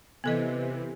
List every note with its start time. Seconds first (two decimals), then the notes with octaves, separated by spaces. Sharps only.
0.24 C3 E3 B3 A4 D#5